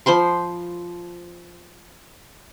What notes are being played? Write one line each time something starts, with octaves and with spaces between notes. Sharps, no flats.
F3 C5 B5 C6